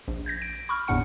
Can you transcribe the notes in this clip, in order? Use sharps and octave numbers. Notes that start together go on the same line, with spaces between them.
A#1
G6 G#6 A#6
D7
B5 C#6 F6
G1 E2 A2 D4 F#5 C#7